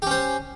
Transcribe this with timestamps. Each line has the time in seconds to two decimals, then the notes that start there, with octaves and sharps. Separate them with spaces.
0.02 G4
0.07 C#4
0.11 C5